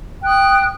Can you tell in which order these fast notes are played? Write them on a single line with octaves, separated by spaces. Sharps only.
G5 F#6 D#6